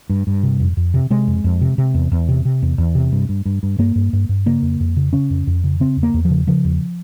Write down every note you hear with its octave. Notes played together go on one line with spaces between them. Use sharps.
G2
G2
C3
F2
F2
C3
C3 G#3
F2
F2
C3
C3
E2
E2
C3
C3
E2
E2
C3
G2
G2
G2
G2
G2 A#3
G2
G2
G2
C#3 A#3
F2
F2
C#3
C#3 C#4
F2
F2
C#3
C#3 C4
E2
A#3
E2
F3
C#3
C#3 F3
E2